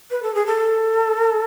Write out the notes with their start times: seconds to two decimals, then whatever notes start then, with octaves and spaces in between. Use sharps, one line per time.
0.11 B4
0.22 A4
0.34 G#4
0.46 A4